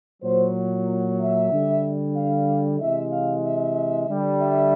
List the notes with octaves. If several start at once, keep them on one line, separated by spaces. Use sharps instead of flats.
A#2 F#3 C5
E5
D3 G3
F5
C3 E3 G#3 E5
F5
E5
D3 G3
E5